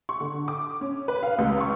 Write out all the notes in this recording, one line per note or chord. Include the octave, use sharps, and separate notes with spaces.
C#6
D3
D6
C#4
B4
F5
C#2
C#6